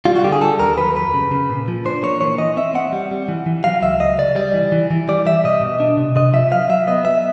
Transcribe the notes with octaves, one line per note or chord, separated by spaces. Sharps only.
G3 F4
F#4
D3 G4
G#4
G3 A4
D#2 A#4
F#3 B4
F2 B4
C#3
C#3
A#2
F3
D4 C5
A#3 C#5
E3 C#5
E3 D#5
C4 E5
C4 F#5
G3
G3
E3
E3
F#3 F5
C#2 E5
C#2 D#5
C#3 D5
G3 D5
E3
E3
E3
G3 D5
G3 E5
B2 D#5
B2
D4
C3
C3 D#5
F3 E5
F#3 F5
F#3 E5
B3 D#5
B3 E5